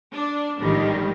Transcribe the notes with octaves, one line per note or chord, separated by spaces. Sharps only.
D4
A1 G#2 D3 D#3 F3 G3